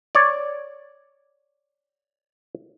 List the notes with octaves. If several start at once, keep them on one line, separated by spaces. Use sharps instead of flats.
C#5 D5